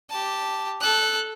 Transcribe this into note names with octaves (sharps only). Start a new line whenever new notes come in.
G4 A5
A4 F#6